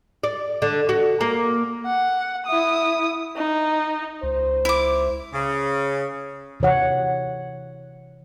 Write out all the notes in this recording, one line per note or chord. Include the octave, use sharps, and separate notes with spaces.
D5
D3
F#4
A#3
F#5
E4 D#6
D#4
C#2 C5
E4 D6
C#3
C3 E3 C#5 F#5